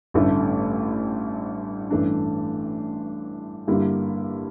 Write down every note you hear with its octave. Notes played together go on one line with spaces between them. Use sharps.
A1 G2 D3 A3 E4
A1 G2 E3 A3 D4
G2 D3 G3 A#3 E4